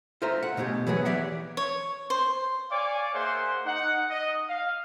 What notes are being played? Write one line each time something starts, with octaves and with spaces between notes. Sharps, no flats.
F4 A4 C5 E5 A#5
F#5
B2 A3 G4 G#4
E3 F#3 B3 G#4
E3 G4 D5 E5 F#5
C#5
C5
C#5 D5 F5 G#5 D6
A#3 G#4 C5 E5 F#5 C6
D#4 F#5
D#5
F5